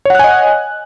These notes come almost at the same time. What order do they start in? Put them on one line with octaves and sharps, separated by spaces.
C#5 F#5 F#6 G#5 D#5